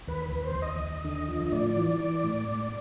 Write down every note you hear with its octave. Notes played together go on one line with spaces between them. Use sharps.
D#2 B4
B4
D#2
C5
D#2
D#5
D#2
D3
F3
D#5
A2 D5
E3
E3
A2
A2